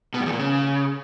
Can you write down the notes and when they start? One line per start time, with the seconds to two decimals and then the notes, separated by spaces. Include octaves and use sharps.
0.14 B2
0.20 G2
0.26 E2
0.32 A#2
0.38 C#3